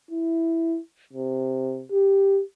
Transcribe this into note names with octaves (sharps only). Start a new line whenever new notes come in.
E4
C3
G4